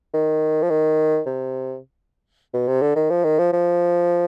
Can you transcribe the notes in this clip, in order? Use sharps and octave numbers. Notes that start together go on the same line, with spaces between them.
D#3
F3
D#3
C3
B2
C3
D3
D#3
F3
D#3
F3
F3